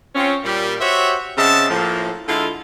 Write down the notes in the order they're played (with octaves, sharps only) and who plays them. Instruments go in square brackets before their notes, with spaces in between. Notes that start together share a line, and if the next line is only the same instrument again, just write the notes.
[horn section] C4 C#4 F4
A#2 G3
F#4 G4 C5 C#5 E5
C#3 C4 D#5 E5 F#5 A5
A2 F3 A#3
D3 G#3 E4 F4